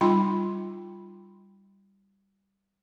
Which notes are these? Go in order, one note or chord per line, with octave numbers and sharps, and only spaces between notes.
G3 D#4 F4 G5 B5 C6